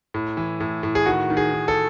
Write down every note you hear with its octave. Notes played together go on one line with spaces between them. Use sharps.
A2
E3
A2
A2
G#4
D#3 F#4
D#3
G#4
D#3
A4